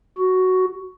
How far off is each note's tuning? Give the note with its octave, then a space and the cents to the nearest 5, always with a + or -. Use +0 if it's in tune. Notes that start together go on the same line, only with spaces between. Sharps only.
F#4 +5